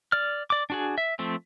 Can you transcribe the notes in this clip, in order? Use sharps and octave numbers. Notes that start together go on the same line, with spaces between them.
D5 F6
D5 D6
D4 F#4 G#4
E5
F3 A3 C4